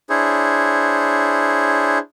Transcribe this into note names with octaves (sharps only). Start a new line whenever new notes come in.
D4 E4 G#4 C5 C#5